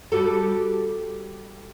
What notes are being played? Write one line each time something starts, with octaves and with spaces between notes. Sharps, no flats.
G3 F#4 A4